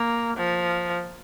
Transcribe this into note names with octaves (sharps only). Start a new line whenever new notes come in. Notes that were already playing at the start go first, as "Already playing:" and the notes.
Already playing: A#3
F3